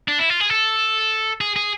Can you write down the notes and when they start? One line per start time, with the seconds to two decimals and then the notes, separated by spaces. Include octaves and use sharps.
0.08 D4
0.19 E4
0.30 F4
0.40 G#4
0.50 A4
1.41 G#4
1.56 G#4